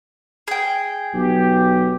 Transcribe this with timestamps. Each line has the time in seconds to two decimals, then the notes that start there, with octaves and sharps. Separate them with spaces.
0.48 G#4 G5
1.14 B1 G4